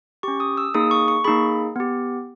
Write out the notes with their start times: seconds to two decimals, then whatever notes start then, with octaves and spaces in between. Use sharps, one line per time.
0.23 C#4 G4 C#6
0.40 D#6
0.57 E6
0.74 A#3 D#4 G#4 D#6
0.91 C#6
1.08 C#6
1.24 A#3 D#4 G#4 B5
1.76 B3 G4